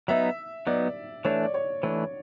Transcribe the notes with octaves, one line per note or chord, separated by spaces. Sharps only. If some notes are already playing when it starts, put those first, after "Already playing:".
F#3 B3 D#4 E5
F#3 B3 D#4 D5
E3 A3 D4 C#5
D5
C#5
E3 A3 D4 C#5